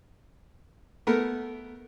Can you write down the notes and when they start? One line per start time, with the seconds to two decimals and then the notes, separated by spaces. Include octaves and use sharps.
1.07 A3 B3 A#4